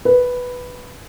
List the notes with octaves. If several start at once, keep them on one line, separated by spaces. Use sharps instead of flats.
B4